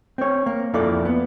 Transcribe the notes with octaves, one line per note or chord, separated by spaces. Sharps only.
C4 C#5
A#3
F2 A#3 E4 A4 D5
B3